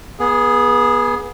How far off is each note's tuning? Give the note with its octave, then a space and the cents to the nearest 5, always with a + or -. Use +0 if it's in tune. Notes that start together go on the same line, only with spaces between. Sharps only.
B3 -30 G#4 +0